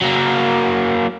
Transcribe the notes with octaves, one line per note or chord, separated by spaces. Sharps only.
F#3 A#3